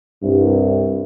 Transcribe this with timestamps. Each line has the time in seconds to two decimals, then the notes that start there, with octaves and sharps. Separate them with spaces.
0.23 C2 G2